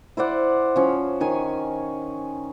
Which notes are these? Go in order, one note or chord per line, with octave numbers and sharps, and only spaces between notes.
E4 C5 D5 F#5
F3 C#4
D#3 C#5 G#5